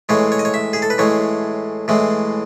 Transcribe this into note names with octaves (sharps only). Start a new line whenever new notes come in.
A2 E3 G#3 C#5
C#5
D#5
C#5
E5
G#4
A4
B4
A2 E3 G#3 C#5
A2 E3 G#3